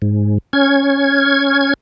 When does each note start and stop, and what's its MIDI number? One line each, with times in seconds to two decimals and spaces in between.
0.02 0.38 44
0.53 1.74 61
0.53 1.74 92